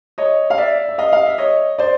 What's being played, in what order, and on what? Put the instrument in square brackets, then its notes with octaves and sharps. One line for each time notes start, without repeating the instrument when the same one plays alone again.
[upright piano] C#5 D#5
F5
D5 E5
E5
D#5 F5
F5
E5
C#5 D#5
C5 D5